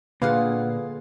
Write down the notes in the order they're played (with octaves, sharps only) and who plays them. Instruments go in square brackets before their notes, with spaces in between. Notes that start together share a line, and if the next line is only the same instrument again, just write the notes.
[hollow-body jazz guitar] A#2 [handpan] D3 G#4 [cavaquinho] F4 F5 F#5 [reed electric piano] B4